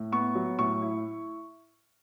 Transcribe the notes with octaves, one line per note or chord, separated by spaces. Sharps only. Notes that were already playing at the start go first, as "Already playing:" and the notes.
Already playing: A2
B3 C#6
F#3
A2 C#6
E4